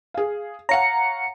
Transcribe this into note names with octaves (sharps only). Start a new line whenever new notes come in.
G#4 F5
C#5 F5 F#5 A#5 C#7